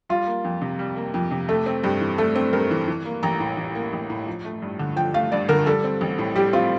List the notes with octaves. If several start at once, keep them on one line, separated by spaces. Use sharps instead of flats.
G3 F4
A#3
F2
C3
G3
A#3
F2
C3
A3 A4
C4
G2 G4
E3
A3 A4
C4
G2 A#4
E3
E3
A#3
A1 A#5
A2
E3
A#3
A1
A2
F3
A3
G2
D3
F3 G5
A3 F5
G2 D5
D3 A#4
G3 A4
C4
A1
A2
G3 G4
C4 F4